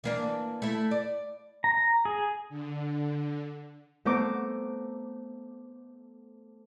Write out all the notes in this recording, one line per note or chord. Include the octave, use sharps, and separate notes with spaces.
E3 A#3 D4
A3 E4
D5
A#5
G#4
D3
A3 B3 C5 A#5 C6 D6